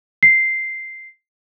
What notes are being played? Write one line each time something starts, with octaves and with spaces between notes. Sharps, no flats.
C7